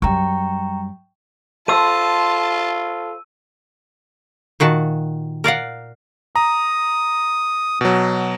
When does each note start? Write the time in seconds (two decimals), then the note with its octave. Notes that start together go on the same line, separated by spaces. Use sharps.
0.02 F#2 G3 G5 A#5 C#6
1.68 F4 A4 C5 A5 E6 D#7
4.60 A#2 D#3 F#4 A5
5.44 A#4 D5 F5 F#5
6.36 A#5 D#6
7.81 B2 F#3